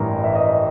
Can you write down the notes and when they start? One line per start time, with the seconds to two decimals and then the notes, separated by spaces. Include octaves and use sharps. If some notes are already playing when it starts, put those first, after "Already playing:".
Already playing: A1 G2 E3 A#4
0.24 E5
0.35 D#5